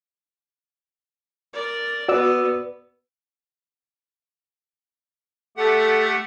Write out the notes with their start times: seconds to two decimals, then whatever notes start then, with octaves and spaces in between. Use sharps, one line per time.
1.53 A#4 D5
2.09 B3 F#4 B4 D5 E6
5.57 A3 G4 A4 F#5